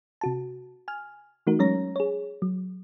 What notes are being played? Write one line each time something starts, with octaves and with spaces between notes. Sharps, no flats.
C3 F#4 A5
G#5 F6
E3 A3 D#4 F#4 A#4
F#3 G#3 C#4 C#5 A#5 A#6
G#4 C#5
F#3